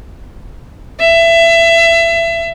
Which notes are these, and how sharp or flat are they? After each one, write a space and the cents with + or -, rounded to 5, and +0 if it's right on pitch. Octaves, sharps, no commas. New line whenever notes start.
E5 +25